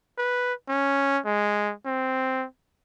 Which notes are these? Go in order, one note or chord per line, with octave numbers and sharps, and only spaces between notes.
B4
C#4
G#3
C4